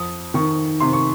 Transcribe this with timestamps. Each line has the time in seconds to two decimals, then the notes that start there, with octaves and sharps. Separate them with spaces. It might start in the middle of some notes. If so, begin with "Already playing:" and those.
Already playing: F2 D#6
0.34 D#3 C#6
0.80 C3 C6
0.93 C#6